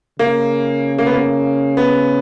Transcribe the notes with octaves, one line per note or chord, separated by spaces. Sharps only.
C#3 A#3
A#3
B3
A#3
B3